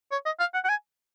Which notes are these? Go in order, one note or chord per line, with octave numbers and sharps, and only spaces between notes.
C#5
D#5
F5
F#5
F#5
G#5